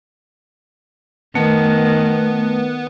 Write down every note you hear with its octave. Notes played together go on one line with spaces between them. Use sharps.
D#3 A3 B3